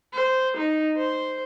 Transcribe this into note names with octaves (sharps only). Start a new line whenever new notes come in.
C5
D#4
C5